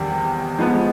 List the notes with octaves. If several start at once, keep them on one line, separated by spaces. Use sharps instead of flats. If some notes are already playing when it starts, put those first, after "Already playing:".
Already playing: E2 C3 D#3 G3 C4
F3 G#3 B3